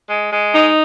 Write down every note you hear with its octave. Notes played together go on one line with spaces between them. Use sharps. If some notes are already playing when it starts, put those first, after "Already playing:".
G#3
G#3
D#4